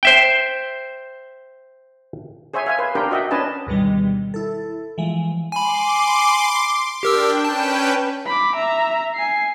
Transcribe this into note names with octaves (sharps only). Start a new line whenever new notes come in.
C5 E5 G5
G#4 C5 C#5 E5 G#5
E5 F5 G#5
B4 C5
D4 G4 A#4 C5 G5
F#4 D#5 E5 F#5 G5
C#4 D4 B4 D#5 G#5 A5
D2 G#2 B2 D#3 G3
E4 A4
E3 F3 G#3
G#5 B5 C6 D6
D4 G4 A#4 G5 E6
C#4 B4 G5 A5
B5 D6
E5 A#5
G#5 C7